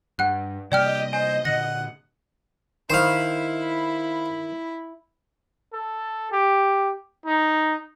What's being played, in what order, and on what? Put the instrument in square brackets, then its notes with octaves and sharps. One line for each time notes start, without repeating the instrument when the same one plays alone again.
[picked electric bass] G2 [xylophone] F#5 F#6
[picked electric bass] C3 G3 A#3 [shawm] G4 [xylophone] D5 G5 F6 [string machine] D#5
[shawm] C5 [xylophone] G#5
[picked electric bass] A#2 D3 [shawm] F#5 [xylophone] A#6
[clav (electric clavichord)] D#3 [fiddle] E4 B5 [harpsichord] C5 F5
[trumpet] A4
G4
D#4